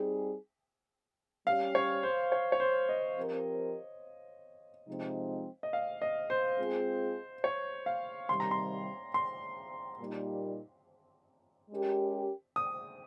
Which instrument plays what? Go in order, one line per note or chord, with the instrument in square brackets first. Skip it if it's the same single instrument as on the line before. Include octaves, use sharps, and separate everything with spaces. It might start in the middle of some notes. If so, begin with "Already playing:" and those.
Already playing: [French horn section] G3 C4 D#4 G#4
[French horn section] G3 C#4 G4 [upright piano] F5
[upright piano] C#5
C5
C#5
C#5
C5
D#5
[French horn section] F3 C4 G4 A#4
C3 F3 G#3 C4 D#4
[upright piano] D#5
F5
D#5
C5
[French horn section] G#3 C4 F4 G#4
[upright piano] C#5
F5
[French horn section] C3 D#3 G3 C4 [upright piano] C6
[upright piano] A#5
C6
C6
[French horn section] A#2 G3 A#3 D#4 G4
G#3 C#4 G4 A#4
[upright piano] D#6